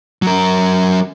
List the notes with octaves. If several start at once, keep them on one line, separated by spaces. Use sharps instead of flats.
F#3 A#4